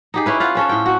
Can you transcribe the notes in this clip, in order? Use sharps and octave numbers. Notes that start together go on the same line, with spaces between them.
D#4 G4 G#4
C#4 E4 B4
F4 B4 F5 F#5
C4 C#4 A4
A2 G5
F#4